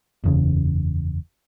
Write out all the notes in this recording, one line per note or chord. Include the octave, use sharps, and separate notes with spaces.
F#1 E2 C#3